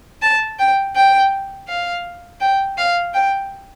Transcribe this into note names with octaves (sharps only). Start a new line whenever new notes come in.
A5
G5
G5
F5
G5
F5
G5